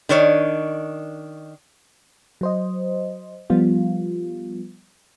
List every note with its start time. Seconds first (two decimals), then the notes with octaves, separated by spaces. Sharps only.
0.09 D#3 D4 C#5 D#5
2.41 F#3 C5 D#5
3.50 F3 G3 B3 F4